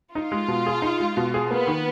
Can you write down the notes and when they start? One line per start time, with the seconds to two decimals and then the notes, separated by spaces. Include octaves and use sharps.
0.15 D#4 F4
0.32 G#3
0.48 B2
0.66 G#4
0.82 D#4
1.00 G#3
1.17 B2
1.34 G#4
1.50 A#3 B3
1.67 D#3